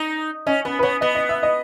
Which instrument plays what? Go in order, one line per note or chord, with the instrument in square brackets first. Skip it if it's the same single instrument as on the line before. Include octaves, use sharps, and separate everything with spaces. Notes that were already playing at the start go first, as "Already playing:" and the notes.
Already playing: [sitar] D#4
[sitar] C#4 [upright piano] D#5
[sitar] B3 [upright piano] B4
[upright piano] B4
[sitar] B3 [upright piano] C#5
[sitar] B3 [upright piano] D#5
[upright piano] D#5
E5
D#5